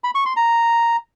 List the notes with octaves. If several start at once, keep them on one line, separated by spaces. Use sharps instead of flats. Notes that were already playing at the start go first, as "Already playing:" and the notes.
B5
C#6
C6
A#5